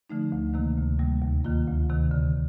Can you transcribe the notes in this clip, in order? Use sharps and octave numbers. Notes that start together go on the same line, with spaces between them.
D3 F3 A3 D#4
D2
C3 D#3 A#3
D2
C3 G3 A#3
D#2
D#3 A#3 F4
D2
C3 D#3
D3